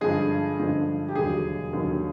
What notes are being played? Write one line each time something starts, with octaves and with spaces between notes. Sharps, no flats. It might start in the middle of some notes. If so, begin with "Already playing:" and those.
G2 D3 F3 G#3 G#4
G2 D3 F3 G#3
G4
E1 D#2 D3 F#3 G#4
E1 D#2 D3 F#3